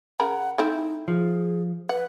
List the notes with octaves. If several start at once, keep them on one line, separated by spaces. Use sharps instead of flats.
C#3 A#4 F#5 B5
A3 C4 D#4 E4
F3 G#4
B4 F#5